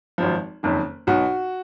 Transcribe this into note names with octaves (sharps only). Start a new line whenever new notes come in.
G#1 F#2 F3
F#1 F2 D#3
B1 B2 F#4